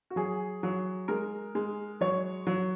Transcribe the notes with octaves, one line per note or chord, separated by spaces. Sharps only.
F#4
F#3 G#4
F#3
G#3 A#4
G#3
F#3 C#5
F#3